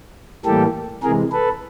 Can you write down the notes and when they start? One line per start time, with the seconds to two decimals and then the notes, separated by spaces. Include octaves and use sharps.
0.45 A2 E3 G3 A#3 G4 A4
1.02 C3 E3 G#3 G#4 A#4
1.32 A4 B4